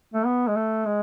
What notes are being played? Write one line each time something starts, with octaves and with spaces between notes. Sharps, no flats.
A3
B3
G#3
A3
G#3